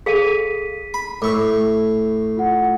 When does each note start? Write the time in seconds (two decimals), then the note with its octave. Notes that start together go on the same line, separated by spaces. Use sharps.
0.06 G#4 A4 F5 B6 D#7
0.94 B5
1.22 A2 C#6 D6 E6
2.37 F4 F#5